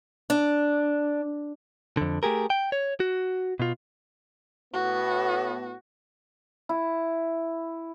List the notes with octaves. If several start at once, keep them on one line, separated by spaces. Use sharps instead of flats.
D4
F2 D3
A3 G4 G#4 A#4
G5
C#5
F#4
B2 F4
A2 B3 F#4
E4